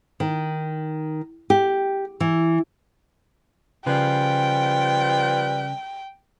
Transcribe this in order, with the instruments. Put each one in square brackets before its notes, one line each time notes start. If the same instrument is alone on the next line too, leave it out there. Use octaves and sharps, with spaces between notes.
[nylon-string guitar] D#3
G4
E3
[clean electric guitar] C#3 [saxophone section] F3 G3 B4 [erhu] G5